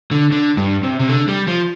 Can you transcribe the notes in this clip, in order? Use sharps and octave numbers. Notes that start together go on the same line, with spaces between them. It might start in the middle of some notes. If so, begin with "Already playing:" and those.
D3
D3
G2
C3
C3
D3
G3
F3